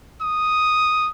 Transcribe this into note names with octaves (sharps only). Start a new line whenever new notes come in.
D#6